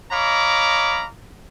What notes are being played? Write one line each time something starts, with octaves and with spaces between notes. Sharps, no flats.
C#5 D#5 F5 A#5 B5 D6